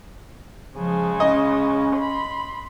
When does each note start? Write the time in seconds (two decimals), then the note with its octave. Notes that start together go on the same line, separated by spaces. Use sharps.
0.76 C#3 F3 G#3
1.20 C#4 D#5
1.95 B5 C6